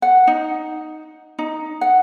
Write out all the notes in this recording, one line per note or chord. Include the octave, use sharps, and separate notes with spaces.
F#5
D#4
D#4
F#5